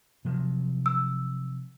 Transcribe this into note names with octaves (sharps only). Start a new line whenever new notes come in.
C3 F3 F#3
E6